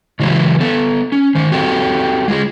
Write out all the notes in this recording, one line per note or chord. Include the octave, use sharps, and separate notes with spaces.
C#3 E3 F#3 G#3 E4
B3 A4
C#4
D#3 C5
C4 F#4 G4 A4
G#3 F4 G4 G#4